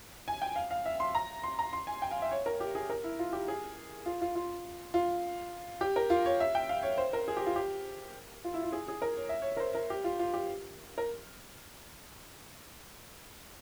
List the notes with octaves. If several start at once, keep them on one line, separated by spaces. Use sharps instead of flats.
G#5
G5
F5
F5
E5
C6
A#5
C6
A#5
C6
G#5
G5
F5
E5
C#5
A#4
G4
G#4
A#4
E4
F4
G4
G#4
F4
F4
F4
F4
G4
A#4
F4
C#5
E5
G5
F5
C#5
C5
A#4
G#4
G4
F4
G4
F4
E4
F4
G#4
G#4
A#4
C#5
E5
C#5
A#4
C5
A#4
G4
F4
F4
G4
A#4